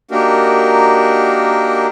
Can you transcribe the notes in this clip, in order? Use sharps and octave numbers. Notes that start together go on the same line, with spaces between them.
A#3 D4 D#4 F#4 G4 A#4